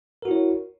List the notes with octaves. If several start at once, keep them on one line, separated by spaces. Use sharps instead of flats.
E4 F#4 A#4 C#5